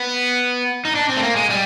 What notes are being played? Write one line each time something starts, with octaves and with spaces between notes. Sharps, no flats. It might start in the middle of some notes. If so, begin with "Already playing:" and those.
Already playing: B3
D#4
D4
C4
A3
A#3
G#3
G3